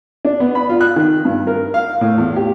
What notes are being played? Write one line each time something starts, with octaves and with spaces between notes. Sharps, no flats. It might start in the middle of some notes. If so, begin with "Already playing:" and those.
D4
B3
B5
F4
F#6
D#3
G2
A#4
F5
A2
E2
G4